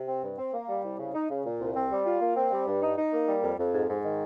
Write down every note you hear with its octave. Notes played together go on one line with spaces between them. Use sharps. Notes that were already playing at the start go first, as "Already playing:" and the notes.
Already playing: C3
C4
G2
C4
A#3
G3
C2
C#3
D#4
C#3
A#2
C2
C4
G3
F4
A#3
C4
G3
G2
D#4
D#4
A#3
G3
F2
F2
G#2
G#2
D#3